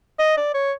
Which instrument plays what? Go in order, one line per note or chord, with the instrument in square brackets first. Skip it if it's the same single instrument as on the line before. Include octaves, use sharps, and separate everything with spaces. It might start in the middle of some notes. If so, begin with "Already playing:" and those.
[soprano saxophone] D#5
D5
C#5